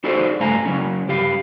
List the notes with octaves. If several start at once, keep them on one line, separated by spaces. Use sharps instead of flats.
D#4 F#4 G#4 A4 C5 D5
G2 C#3 A3 F5 G#5 A#5
C#3 F#3 C#4
G2 G4 F5